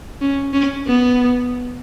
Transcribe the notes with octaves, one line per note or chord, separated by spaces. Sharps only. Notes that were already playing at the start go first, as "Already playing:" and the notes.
C#4
C#4
B3